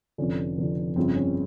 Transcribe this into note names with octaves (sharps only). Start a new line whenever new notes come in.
F1 F2 D3 C#4
F1 F2 D3
G1 F2 C#3 C4
C#4